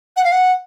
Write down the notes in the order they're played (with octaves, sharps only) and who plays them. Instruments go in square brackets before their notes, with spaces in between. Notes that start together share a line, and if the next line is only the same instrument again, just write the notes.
[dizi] F#5
F5
F#5